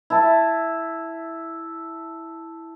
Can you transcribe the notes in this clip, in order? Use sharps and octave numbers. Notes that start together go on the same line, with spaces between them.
E4 A5